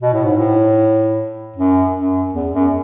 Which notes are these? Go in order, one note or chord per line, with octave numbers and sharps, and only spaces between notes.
B2
A2
G#2
A2
F#2
F#2
E2
F#2